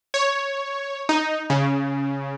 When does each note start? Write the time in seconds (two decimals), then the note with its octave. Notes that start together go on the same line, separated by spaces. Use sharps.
0.14 C#5
1.09 D#4
1.50 C#3